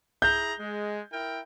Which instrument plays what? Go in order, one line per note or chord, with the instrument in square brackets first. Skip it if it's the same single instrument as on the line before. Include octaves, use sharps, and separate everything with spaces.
[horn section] E4 G#4 A#5 [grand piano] G6
[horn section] G#3
E4 A#4 G5